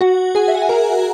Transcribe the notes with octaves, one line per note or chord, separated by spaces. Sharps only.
F#4 F#5
G#4 G#5
E5
F#5
G#5
A#4 A#5